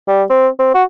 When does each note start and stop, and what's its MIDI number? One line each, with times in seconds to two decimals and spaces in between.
0.07 0.23 55
0.29 0.48 60
0.59 0.73 60
0.74 0.83 66